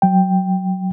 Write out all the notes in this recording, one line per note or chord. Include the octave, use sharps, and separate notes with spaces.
F#3 G5